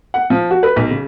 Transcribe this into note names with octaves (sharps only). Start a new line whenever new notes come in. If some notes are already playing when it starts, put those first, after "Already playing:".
F#5
F3
F#4
B4
B1
C#3